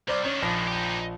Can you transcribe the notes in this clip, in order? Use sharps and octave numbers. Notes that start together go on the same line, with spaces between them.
C2 C5 D5
D#3 C#4 D4
A#1 F3 A#6
D#4 G4